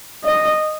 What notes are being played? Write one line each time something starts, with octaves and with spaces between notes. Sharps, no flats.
D#5